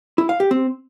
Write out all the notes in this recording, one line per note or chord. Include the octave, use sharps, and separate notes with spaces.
E4
F5
G4
C4